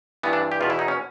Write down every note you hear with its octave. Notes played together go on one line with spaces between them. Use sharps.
G2 E3 B3
D4
G4
E2 B2 F4
E4
D#4
C#4